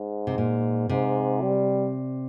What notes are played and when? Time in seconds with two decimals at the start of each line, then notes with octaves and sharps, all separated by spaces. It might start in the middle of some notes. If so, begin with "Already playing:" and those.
Already playing: G#2
0.27 C3
0.38 A#2
0.89 G#2 C3
1.41 G3